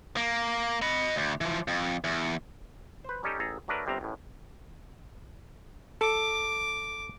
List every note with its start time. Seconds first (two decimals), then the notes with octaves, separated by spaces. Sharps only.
0.17 A#3
0.82 D#5 B5
1.16 D2
1.41 E3 F3
1.68 F2
2.04 E2
3.04 B4 C5
3.23 G3 C#4 D#4 G4 A4
3.40 A1 G#4 A4 A5 A#5
3.68 F#3 A3 D4 A#4 B4
3.86 G1 C3 G3 C4 A#5
4.01 A1 F#2 A2
6.01 A4 D6